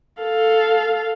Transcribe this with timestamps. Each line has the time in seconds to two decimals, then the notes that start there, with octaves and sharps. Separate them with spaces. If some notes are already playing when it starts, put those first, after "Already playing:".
0.22 A4 F5